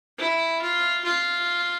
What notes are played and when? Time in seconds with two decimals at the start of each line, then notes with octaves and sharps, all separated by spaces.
0.18 E4
0.61 F4
1.04 F4